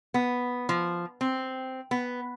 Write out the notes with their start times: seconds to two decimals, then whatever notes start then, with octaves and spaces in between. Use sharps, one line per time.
0.14 B3
0.69 F3
1.21 C4
1.91 B3